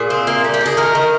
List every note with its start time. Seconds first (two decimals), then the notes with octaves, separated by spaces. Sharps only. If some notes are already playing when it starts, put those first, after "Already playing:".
Already playing: A#2 G#4
0.10 C4
0.27 A#3
0.44 G3
0.54 G4
0.61 A#3 G#4
0.77 D#3 A#4
0.95 D#3